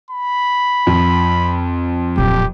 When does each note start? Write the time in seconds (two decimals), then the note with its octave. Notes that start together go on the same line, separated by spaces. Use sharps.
0.10 B5
0.87 F2
2.17 D1 A#2 G4